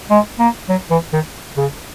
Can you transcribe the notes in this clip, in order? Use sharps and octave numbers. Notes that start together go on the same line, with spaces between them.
G#3
A#3
F#3
E3
D#3
C#3